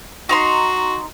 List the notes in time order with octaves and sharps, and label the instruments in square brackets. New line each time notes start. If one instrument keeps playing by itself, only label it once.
[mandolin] D#4 A#5 C6 [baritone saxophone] F#4